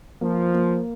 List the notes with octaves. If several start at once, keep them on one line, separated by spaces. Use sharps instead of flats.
F3 A#3
A#3